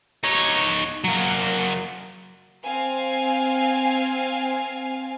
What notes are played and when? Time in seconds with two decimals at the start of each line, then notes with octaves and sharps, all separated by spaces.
0.23 D#4 C#5
1.04 F#3 A#3
2.64 C4 F5 G#5